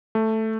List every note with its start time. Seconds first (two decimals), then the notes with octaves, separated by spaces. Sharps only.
0.15 A3